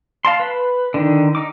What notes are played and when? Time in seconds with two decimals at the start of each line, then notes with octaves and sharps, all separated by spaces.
0.25 F5 A5 C6
0.40 B4
0.94 D3 D#3
1.35 D#4 D6